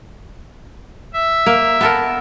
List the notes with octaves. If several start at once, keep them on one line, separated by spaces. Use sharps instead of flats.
E5
A#3
B3 A4 A#4